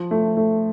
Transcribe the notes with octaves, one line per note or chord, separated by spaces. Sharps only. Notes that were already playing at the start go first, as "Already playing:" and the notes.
Already playing: F3
A3
A3